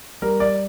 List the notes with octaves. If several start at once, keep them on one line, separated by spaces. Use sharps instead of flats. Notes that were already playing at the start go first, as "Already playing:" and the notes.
G3 A#4
D5